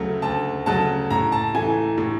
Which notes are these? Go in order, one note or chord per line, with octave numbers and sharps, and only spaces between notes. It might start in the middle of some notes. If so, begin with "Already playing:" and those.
Already playing: D2 C#3 F#3 A3
D2 A5
C#3 F#3 A3 A5
A2 A#5
A5
E3 A3 G#5
A2